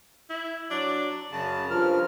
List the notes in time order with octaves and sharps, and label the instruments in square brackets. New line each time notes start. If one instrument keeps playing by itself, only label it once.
[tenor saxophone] E4
[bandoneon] F#3 F#4 [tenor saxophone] D4
[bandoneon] F#2 A5 [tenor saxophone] C#3
[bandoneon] G2 A#4 F6 [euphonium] F3